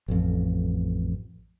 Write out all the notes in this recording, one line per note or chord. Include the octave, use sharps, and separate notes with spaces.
A1 F2